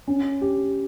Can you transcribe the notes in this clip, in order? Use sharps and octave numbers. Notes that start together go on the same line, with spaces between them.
C#4
G4